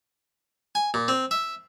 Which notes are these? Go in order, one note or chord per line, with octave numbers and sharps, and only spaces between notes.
G#5
A#2
C4
E5